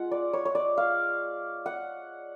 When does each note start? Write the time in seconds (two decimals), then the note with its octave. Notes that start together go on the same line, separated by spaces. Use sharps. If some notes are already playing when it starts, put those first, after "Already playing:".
Already playing: G#3 F4 F#5
0.11 D5
0.33 C#5
0.45 C#5
0.55 D5
0.77 F5
1.66 F#5